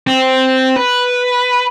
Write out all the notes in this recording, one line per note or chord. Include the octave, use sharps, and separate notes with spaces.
C4
B4